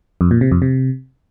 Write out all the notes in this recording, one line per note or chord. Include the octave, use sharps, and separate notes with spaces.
F2
A#2
C3
F2
C3